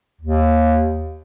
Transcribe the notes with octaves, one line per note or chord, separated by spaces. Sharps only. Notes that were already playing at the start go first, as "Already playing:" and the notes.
D#2